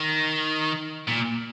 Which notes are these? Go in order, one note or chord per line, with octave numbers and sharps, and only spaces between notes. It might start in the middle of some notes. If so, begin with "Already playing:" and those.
Already playing: D#3
A#2